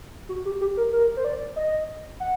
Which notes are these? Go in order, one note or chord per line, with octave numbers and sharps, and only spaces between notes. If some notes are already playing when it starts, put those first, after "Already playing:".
F#4
G4
G4
A#4
A#4
C5
D5
D#5
F#5